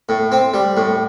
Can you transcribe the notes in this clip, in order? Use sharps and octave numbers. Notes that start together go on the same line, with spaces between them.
A2
C4
G3
A2